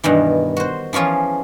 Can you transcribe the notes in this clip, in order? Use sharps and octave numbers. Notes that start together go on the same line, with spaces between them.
G2 B2 D#3 E3
F#4 C5
E3 F3 C#4 F4 G#4